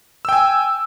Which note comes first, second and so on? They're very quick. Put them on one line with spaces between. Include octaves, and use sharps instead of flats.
E6 G5 G#5